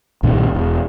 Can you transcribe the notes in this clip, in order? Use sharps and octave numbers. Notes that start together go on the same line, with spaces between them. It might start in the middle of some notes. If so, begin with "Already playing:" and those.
B1 G2 A#2 D#3
E1